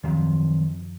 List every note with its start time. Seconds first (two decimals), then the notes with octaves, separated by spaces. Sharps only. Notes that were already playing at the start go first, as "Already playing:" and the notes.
0.04 F#2 D#3 F3 F#3 C4